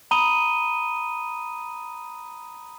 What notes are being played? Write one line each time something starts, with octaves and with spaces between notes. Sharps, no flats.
A#5 B5 D#6 D#7 G7